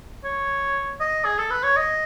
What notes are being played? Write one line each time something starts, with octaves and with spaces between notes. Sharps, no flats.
C#5
D#5
G#4
A4
B4
C#5
D#5